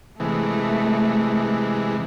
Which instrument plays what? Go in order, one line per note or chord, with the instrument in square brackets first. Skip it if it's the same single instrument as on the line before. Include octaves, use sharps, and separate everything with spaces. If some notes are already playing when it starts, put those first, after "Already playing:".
[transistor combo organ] C3 E3 G#3 [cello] A3